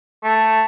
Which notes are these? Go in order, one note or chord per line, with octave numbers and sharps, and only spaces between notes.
A3